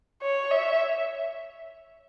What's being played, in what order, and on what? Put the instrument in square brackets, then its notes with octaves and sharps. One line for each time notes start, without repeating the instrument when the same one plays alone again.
[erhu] C#5
E5